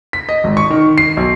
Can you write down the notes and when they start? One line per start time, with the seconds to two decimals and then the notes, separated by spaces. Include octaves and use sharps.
0.13 B6
0.29 D#5
0.44 G#1
0.57 C#6
0.71 D#3
0.98 C7
1.17 B1